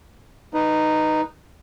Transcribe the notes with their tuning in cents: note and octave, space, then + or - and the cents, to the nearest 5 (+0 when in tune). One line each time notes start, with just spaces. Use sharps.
D#4 -10 B4 -10